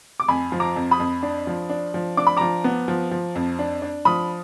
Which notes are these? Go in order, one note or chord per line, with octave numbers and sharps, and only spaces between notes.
D6
F2 G#5 B5
F3
A#5 D6
F2
B5 D#6
F2
D4
F3
D4
F3
D4 D6
B5
F3 A#5 D6
B3
F3
F3
F2
D4
D4
F3 B5 D#6